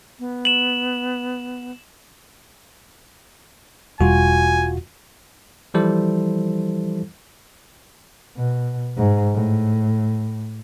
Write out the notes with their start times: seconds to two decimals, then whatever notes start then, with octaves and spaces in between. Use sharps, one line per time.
0.19 B3
0.45 E7 F#7
4.01 E1 G3 F4 F#4 G#5
5.74 E3 F3 G3 E4 A4 C5
8.37 B2
8.97 G#2
9.34 A2